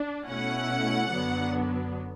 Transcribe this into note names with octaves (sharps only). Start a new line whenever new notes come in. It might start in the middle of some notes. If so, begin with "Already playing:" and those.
Already playing: D4
B2 A3 C#4 E4 F#5
F#2 D3 F#3 B3 D4